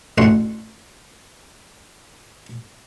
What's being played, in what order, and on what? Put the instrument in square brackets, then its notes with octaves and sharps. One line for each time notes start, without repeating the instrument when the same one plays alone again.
[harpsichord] A1 A2 D4 F#4 F#5 C6